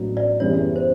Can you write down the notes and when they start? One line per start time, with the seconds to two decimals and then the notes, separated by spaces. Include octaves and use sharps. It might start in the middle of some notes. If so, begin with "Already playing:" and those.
Already playing: A1 A2 F#3 B3 D4
0.17 D5
0.40 F#2 C#3 E3 G3 B3 C#5
0.76 C5